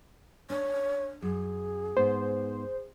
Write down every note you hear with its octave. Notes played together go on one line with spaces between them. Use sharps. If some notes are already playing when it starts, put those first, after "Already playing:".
D4 C#5
F#2 G#4
G#2 B3 C5